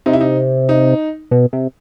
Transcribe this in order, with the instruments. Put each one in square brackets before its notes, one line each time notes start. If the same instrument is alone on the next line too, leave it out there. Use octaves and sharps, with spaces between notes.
[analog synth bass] C3 [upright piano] D#4
[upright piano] E4
D#4
D#4
[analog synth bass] B2
C3